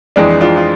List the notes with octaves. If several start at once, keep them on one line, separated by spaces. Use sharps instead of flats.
F2 E3 G#3 D4
D4 F4
F4